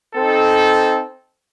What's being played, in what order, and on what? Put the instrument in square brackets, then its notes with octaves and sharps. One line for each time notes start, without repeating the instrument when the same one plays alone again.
[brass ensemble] C4 D#4 A4